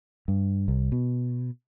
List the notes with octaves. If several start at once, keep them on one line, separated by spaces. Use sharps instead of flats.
G2
C2
B2